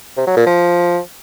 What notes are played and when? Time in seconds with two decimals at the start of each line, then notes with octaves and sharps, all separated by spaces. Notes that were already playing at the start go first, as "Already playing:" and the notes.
0.17 C3
0.27 F#3
0.37 A#2
0.46 F3